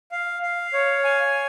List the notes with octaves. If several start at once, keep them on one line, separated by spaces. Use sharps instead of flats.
F5
F5
C#5
G#5